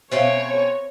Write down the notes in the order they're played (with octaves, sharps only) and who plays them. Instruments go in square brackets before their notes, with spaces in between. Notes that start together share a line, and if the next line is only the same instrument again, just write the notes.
[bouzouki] B2 C4 C#4 [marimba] C5 E5 F5 [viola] C#5